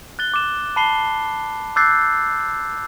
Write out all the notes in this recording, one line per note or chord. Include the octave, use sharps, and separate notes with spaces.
F#6 A6 G7
D6 E7
A5 B5 C7 G7
D6 E6 F#6 G6 A6 C7